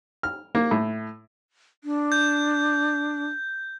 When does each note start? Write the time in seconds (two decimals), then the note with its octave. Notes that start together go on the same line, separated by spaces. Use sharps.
0.23 F6
0.55 A#3
0.71 A2
1.84 D4
2.12 G6